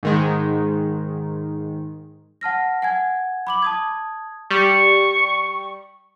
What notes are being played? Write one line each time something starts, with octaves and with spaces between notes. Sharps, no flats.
G#2 D#3 G#3
F#5 A5 F6 A#6
F#5 G#5 G#6
B5 D6 F#7
A5 D#6 G#6
G3 C#6